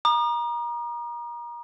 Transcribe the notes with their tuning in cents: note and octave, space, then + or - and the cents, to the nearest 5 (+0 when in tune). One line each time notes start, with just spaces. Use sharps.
A#5 +30 D#6 -45